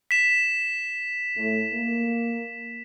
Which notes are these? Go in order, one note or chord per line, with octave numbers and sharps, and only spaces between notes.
B6 E7
A2 A3
A#3